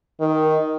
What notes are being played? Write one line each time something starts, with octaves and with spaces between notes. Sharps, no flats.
D#3